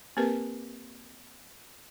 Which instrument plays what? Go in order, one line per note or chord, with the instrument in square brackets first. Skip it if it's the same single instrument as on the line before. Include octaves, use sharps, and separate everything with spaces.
[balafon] A#3 C4 G4 A#4 B4